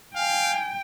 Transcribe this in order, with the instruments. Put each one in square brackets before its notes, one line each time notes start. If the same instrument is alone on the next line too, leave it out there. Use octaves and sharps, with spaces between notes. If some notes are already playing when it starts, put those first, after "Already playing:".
[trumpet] F5 [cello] G5 [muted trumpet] G#5